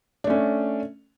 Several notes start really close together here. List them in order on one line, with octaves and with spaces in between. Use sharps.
D4 A3 C#4